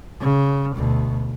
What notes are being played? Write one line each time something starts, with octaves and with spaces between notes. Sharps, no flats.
C#3
D2 B2